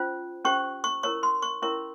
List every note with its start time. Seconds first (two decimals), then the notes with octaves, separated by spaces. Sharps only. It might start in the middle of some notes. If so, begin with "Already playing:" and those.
Already playing: C#4 F4 C5
0.45 C#4 G4 C5 C#6
0.84 C#6
1.03 E4 A#4 C#5 C#6
1.23 C6
1.42 C#6
1.62 C#4 E4 A#4 C#5 C#6